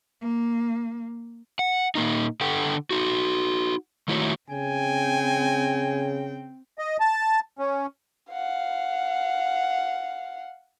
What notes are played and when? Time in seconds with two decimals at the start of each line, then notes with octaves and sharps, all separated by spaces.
0.22 A#3
1.59 F#5
1.95 A#2 A#3 D#4
2.41 D3 A4 F#5 G5
2.91 D#4 F#4
4.08 D#3 A3 E4 F#4 C#5
4.50 C#3 C4 G5 G#5
6.78 D#5
7.00 A5
7.59 C#4
8.32 F5 F#5